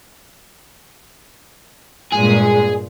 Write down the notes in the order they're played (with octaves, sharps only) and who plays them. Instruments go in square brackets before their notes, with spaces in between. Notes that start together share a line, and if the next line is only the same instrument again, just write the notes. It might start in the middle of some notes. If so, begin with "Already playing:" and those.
[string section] G2 A#2 G#3 [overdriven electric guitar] G#4